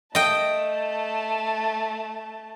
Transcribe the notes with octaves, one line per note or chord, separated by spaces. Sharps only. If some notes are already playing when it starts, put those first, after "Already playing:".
A3 D#5 G5 A5